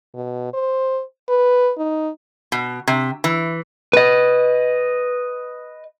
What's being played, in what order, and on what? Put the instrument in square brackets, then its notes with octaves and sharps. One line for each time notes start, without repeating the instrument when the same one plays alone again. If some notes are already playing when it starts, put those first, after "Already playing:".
[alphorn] B2
C5
B4
D#4
[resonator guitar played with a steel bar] B2
C3
E3
[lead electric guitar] B4 D#5